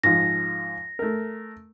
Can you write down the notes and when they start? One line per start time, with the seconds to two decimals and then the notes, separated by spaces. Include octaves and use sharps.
0.04 G#2 F3 A#6
0.99 A3 A#4